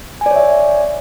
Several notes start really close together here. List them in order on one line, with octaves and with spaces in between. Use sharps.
G#5 D5 C#5 E5